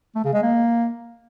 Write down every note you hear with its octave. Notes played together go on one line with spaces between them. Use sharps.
A3
C#3
G#3
A#3